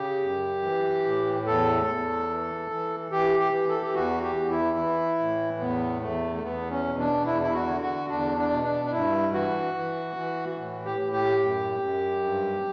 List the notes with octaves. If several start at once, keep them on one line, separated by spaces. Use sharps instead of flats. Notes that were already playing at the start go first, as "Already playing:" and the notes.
Already playing: C#3 G4
F#2
E3
A2
E2 A4
E2
E3
E3
E3 G4
G4
E3
A4
G4
E2 F#4
G4
E2
E4
E3
A2
E2 B3
E2 A3
A3
E2 B3
C#4
B2
D4
E2 E4
E4
F#4
D3
F#4
E2 D4
D4
B2
D4
D4
G2 E4
E3 F#4
E3
E3
A2
G4
A2
G4
F#2
F#2
G2